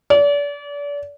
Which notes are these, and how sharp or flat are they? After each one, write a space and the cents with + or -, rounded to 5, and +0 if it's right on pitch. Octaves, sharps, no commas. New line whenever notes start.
D5 -35